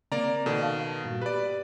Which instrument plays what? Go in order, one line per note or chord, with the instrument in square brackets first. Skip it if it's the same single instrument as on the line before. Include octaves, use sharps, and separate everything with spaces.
[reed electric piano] C#3 C4 [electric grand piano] A#3 D5 A#5
[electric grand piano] B2 D#3 [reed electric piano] A4 D5
[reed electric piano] F5 A5
G2 A#2 F#4
[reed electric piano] G4 B5 [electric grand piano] B4 D5